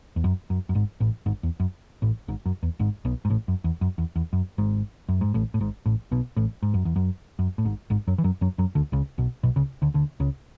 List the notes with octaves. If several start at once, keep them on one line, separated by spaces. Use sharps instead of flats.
E2
F#2
F#2
F#2
G#1 G#2
A1 A2
G#1 G#2
E2
F#2
A1 A2
G#1 G#2
F#2
E2
G#1 G#2
B1 B2
G#2
A1 A2
F#2
E2
F#2
E2
E2
F#2
G#1 G#2
F#2
G#2
A1 A2
A2
G#1 G#2
A1 A2
B1 B2
A1 A2
G#2
F#2
E2
F#2
F#2
A2
G#1 G#2
G#1 G#2
F#2 F#3
E3
F#2 F#3
F#2 F#3
F#2 F#3
D2 D3
C#2 C#3
B1 B2
B1 B2
C#2 C#3
D2 D3
D2 D3
C#2 C#3